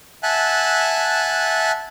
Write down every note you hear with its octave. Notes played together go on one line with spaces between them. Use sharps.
E5 F#5 G#5 A5 F#6